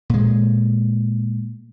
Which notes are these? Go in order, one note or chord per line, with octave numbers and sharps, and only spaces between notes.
A#2 G#3